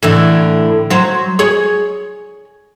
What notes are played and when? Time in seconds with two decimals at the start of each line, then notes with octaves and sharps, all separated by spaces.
0.03 A2 D3 E3
0.90 F#3 C5
1.39 G#4 C#5